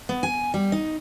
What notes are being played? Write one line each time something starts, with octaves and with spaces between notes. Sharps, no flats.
B3
G#5
G3
D#4